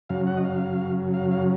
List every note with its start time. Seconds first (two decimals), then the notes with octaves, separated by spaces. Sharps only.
0.09 F#2 C#3 F#3 F5
0.27 F#5
0.37 D#5
0.44 F5
1.14 F5
1.31 F5